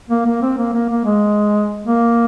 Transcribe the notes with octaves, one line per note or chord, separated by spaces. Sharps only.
A#3
A#3
C4
A#3
A#3
A#3
G#3
A#3